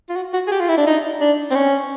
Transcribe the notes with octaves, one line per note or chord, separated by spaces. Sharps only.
F4
F#4
F#4
G#4
G4
F4
E4
D4
D#4
D4
C4
C#4